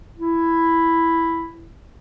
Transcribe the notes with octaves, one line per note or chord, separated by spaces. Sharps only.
E4